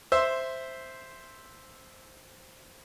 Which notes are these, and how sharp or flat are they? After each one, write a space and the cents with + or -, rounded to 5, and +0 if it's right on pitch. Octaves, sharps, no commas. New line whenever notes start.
C5 +0 E5 +0 C6 +10